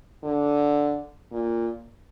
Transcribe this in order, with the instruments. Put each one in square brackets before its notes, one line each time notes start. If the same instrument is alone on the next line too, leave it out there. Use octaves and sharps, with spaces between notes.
[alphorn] D3
A#2